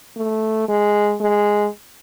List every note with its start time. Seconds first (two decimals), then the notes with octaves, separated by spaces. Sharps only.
0.17 A3
0.68 G#3
1.20 G#3